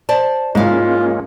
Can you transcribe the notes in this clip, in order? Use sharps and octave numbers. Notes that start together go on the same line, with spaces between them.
C5 D5 A5
G#2 G#3 A#3 C#4 E4 F4 F5